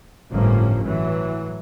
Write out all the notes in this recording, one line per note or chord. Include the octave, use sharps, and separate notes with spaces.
G1 A2 F3 A#3 C#4
A2 E3 F#3